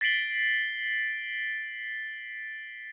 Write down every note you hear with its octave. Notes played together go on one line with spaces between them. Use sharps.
A6 B6 C7 D7 F#7 G7